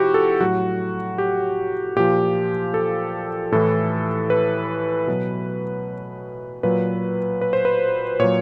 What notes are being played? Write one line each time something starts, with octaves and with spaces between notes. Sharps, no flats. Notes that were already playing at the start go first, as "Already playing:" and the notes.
Already playing: C3 F3 E4 F#4 G4
A4
A2 F#3 F#4
G4
A#2 F3 G4
A4
A2 E3 A4
B4
B2 F#3
A#2 F#3 B4
B4
C5
B4
A#2 F#3 C#5